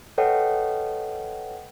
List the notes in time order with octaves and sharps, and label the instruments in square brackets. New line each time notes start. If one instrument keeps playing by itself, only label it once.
[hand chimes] A4 B4 C#5 D#5 F#5 G5